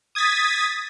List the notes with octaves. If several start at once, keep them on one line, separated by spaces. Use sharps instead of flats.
D#6 G#6 A6 B6